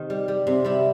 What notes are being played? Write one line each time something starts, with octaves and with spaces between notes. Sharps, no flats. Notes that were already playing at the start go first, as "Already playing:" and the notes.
Already playing: C3 D#3 D#4
G3
G3
C3
G3 E4